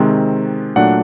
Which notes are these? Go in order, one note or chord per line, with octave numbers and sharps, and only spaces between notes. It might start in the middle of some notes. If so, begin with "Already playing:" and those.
Already playing: C3 D#3 G#3 C4
A#2 F#3 A3 D4 F#5